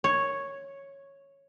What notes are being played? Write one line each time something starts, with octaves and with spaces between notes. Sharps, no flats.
C#5